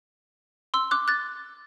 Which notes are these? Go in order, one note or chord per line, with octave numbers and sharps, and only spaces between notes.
C6 E6
D6 F#6
F#6 A6